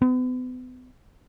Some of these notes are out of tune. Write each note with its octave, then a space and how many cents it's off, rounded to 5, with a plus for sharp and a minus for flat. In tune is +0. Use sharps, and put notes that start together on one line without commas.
B3 +40